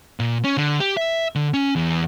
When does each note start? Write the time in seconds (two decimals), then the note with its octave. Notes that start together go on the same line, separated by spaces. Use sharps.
0.20 A#2
0.44 C#4
0.57 D3
0.80 G4
0.97 E5
1.35 D3
1.54 C#4
1.76 E2